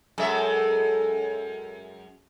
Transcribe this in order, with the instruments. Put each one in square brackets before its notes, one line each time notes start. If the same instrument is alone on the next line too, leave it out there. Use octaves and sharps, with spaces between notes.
[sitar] F#2 G#3 E5 [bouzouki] A4